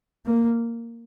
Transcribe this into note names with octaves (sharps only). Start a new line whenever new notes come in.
A#3